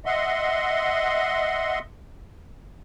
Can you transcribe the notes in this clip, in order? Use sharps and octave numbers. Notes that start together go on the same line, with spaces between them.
D#5 E5 F#5 C6